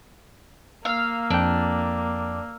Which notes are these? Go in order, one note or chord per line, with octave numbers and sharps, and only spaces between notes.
A#3 F5 E6 F6
F2 D4 G5